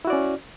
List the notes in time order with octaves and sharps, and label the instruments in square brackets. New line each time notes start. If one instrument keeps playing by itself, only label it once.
[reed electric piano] E4
F#4
D5
C#4